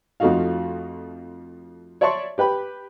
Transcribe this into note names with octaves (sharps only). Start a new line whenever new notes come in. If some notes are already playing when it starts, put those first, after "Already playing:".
F2 F3 A3 D#4 F#4 F5
C#5 D5 E5 A5 C6 C#6
G4 B4 G5 B5